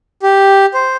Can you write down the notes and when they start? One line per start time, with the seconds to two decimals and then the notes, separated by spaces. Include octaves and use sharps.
0.23 G4
0.74 C5